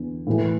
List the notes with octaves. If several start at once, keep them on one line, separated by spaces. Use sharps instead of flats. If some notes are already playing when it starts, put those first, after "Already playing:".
Already playing: E2 D3
A2 E3